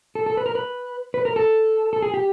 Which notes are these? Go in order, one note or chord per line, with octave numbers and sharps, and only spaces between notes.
A4
A4
B4
A#4
B4
B4
A#4
A4
A4
G#4
G4